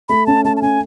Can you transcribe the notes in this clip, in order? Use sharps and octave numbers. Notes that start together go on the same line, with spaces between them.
A3 B5
C#4 A5
A3 A5
A5
C#4 G#5